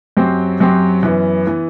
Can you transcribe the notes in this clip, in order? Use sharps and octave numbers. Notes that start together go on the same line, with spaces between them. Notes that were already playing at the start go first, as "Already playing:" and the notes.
F#2 F#3 C4 G4 C5
F#2 F#3 C4 G4 C5
F#2 E3 B3
E3 B3